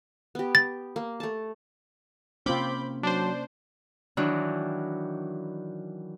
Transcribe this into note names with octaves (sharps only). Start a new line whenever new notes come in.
B3 G4
A6
A#3
A3 A5
C3 A#3 C4 C#4 F4 B5 D6 G6
F#3 D4 C5
D#3 E3 F#3 D4